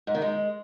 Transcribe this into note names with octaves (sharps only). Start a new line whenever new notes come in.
G#2
D#3
G#3